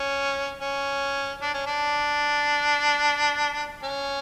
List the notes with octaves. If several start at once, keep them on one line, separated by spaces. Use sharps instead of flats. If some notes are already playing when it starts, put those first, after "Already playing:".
Already playing: C#4
C#4
D4
C#4
D4
C#4